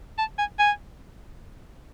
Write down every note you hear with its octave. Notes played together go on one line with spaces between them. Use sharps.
A5
G#5
G#5